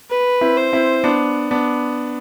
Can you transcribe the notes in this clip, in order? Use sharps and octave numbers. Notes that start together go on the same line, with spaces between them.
B4
C4 E4
C5
C4 E4
B3 D4
B3 D4